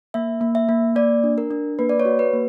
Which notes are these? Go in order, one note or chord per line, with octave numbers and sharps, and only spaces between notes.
A#3 E5
A#3
E5
A#3
A#3 D5
D4
A#4
D4
A#3 B4
D5
C#5
F#4
B4
A#3